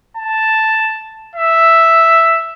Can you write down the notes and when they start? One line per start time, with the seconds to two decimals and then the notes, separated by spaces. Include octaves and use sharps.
0.17 A5
1.36 E5